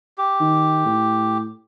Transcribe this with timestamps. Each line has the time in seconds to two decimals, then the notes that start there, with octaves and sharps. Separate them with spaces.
0.18 G4
0.40 D#3
0.86 A2